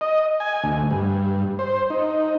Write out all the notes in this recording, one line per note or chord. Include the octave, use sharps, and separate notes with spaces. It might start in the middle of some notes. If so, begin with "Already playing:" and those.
D#5
G#5
D2
G2
C5
D#4